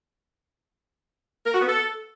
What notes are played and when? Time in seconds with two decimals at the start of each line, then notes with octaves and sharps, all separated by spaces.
1.45 A#4
1.52 F#4
1.60 B3
1.67 A4